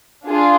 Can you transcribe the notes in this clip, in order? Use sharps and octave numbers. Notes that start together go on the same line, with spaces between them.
D4 F4 G#4